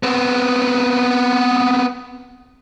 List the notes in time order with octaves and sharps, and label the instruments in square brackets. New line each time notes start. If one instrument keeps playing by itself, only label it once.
[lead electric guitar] B3 C4